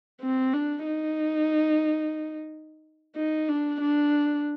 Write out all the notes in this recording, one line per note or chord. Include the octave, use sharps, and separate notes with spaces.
C4
D4
D#4
D#4
D4
D4